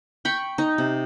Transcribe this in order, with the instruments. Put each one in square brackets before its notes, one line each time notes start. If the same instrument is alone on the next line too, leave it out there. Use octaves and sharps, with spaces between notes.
[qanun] G5 B5 C#6
D#4
C3